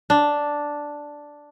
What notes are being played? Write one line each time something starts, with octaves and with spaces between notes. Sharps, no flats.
D4